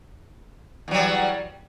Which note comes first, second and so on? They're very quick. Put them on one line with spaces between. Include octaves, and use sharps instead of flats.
E2 F#3 G3